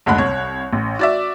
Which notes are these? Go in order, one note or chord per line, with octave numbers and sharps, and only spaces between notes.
F#1 D2 G#3 B5 F#6
C2 C#5
A1
F#4 D5 E5